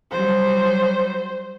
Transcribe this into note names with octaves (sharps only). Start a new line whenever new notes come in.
F#3 G3 C5